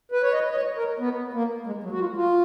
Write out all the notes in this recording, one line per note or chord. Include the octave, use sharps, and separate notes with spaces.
B4
C#5
D#5
D#5
C#5
A#4
B3
A#3
G#3
F#3
F#4
F4
F4